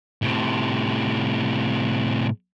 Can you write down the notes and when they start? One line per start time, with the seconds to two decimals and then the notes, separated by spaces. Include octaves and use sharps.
0.22 A2 C3